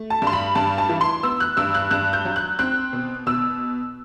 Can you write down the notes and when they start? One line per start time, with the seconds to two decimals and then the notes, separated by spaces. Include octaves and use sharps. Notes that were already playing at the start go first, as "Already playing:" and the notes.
Already playing: A3
0.10 A5
0.22 G2
0.27 C6
0.33 B5
0.55 G2 A5
0.78 A5
0.89 E3
1.01 C6
1.23 B3 E6
1.40 F#6
1.57 G2 E6
1.75 F#6
1.91 G2 F#6
2.13 G6
2.25 F#3
2.36 F#6
2.59 C4 F#6
2.93 B2
3.27 B2 E6